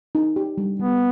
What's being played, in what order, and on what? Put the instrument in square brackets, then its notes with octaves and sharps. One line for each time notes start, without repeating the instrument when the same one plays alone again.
[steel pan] D#4
G4
G3
[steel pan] G3 [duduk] B3